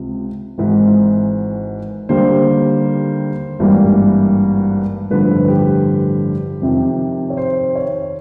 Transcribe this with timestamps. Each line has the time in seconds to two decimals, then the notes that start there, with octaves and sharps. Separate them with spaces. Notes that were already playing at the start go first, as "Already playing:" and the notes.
Already playing: C#2 C3
0.58 G#1 G#2 E3 G#3
2.09 D#2 D3 G3 A#3 C5
3.59 G#1 G2 E3 G3 A#3
5.10 A1 G2 D3 F3 B4
5.48 G4
6.62 F2 C3 D#3
7.30 C#5
7.37 C5
7.75 C#5